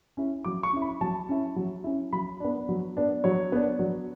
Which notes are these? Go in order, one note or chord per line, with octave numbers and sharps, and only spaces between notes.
C#4 E4
F#3 D6
C#6
C#4 E4
B5
F#3 A5
C#4 E4
F#3
C#4 E4
F#3 B5
B3 D4
F#3
B3 D4
F#3 C#5
B3 D4
F#3